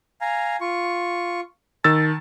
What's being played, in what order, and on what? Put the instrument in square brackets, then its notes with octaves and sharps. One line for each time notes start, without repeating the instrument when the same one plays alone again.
[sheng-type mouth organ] F5 G#5 A#5
F4 C#6
[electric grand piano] D#3 E6 A6 [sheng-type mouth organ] A5